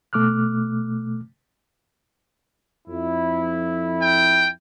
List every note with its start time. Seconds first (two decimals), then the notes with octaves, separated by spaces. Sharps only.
0.13 B2 A3 D6 F6 F#6
2.87 F2 E4
4.02 G5